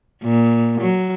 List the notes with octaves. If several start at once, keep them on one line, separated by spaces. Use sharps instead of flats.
A#2
F#3